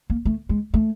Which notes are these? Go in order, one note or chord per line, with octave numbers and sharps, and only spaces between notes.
A#3
A3
G#3
A3